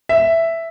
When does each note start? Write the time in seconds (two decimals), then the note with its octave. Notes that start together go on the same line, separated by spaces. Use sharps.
0.09 E5